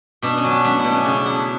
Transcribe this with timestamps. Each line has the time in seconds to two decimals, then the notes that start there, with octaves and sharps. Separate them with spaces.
0.22 B2 D4
0.37 C#4
0.44 F#3
0.51 D4
0.64 A3 D4
0.79 E4
0.84 B2
0.92 C#4
1.05 C#3 D4
1.16 D4
1.25 F#3 E4
1.36 D4